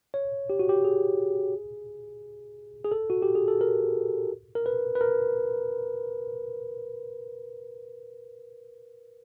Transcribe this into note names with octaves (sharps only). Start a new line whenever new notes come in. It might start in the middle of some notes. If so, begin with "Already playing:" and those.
C#5
G4
F#4
G4
G#4
G#4
A4
F#4
G4
G#4
A4
A#4
A#4
B4
B4
A#4